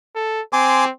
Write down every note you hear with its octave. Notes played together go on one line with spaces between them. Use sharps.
A4
C4 G#5 C6 D6